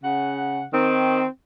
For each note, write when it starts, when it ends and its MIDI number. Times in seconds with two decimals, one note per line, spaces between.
0.03 0.63 49
0.03 0.63 78
0.72 1.24 51
0.72 1.24 60